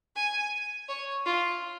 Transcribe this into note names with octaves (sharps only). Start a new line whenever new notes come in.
G#5
C#5
F4